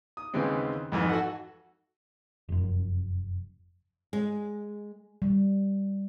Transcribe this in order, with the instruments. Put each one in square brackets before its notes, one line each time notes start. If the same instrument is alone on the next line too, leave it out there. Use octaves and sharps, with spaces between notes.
[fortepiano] D#6
D#2 C#3 E3 G#3 B3 C4
F2 G#2 E3
F#4 A4 F#5
[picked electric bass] F1 F#2
[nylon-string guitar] G#3
[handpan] G3